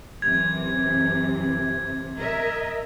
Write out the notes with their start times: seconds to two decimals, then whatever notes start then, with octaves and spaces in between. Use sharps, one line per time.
0.22 F#2 C3 E3 G#6
2.17 A#4 D#5 E5